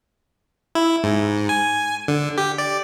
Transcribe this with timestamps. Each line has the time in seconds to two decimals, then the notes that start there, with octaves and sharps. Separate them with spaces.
0.75 E4
1.04 G#2
1.49 G#5
2.08 D3
2.38 G4
2.58 D5